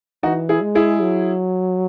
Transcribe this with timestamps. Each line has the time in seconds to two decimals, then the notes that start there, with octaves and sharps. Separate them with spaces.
0.23 E3 D#4 F#4
0.49 E4 G#4
0.62 G#3
0.75 E4 G#4
1.01 F#3